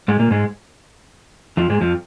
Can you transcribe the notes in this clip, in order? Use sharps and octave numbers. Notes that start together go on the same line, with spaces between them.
G#2 G#3
A#2 A#3
G#2 G#3
F2 F3
G#2 G#3
F2 F3